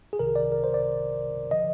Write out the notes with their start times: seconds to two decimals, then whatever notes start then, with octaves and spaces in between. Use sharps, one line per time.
0.13 G#4
0.19 C2 C3 D#3 A#4
0.36 D5
0.52 A#4
0.64 C5
0.74 D5
1.51 D3 F3 D#5